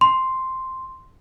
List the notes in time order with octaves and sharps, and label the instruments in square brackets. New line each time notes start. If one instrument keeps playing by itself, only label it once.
[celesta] C6